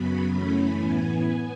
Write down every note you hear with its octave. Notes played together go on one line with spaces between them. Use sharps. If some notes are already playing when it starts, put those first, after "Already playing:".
Already playing: F#2 C#3 F#3 B3 B5
F#2 E3 A3 C#4
A2 E3 B3 G#5
B3